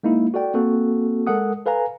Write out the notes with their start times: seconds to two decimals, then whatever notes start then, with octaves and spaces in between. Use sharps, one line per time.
0.03 G#3 A#3 D#4 E4
0.34 F#4 A4 D5 G5
0.54 A#3 C4 F#4 A4
1.27 G#3 A4 A#4 F#5 D#6
1.66 A4 B4 F5 G#5 A#5